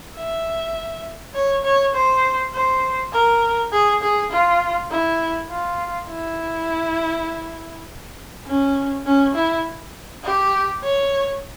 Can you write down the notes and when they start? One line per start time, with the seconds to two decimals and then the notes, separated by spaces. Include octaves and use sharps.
0.17 E5
1.35 C#5
1.64 C#5
1.95 C5
2.54 C5
3.12 A#4
3.72 G#4
4.02 G#4
4.31 F4
4.91 E4
5.50 F4
6.09 E4
8.46 C#4
9.06 C#4
9.35 E4
10.24 G4
10.83 C#5